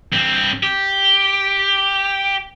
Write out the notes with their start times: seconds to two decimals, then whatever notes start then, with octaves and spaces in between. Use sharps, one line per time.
0.13 G2 C4
0.63 G4